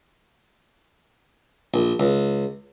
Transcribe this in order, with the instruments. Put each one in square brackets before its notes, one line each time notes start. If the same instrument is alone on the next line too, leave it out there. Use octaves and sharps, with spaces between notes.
[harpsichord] A#1
C#2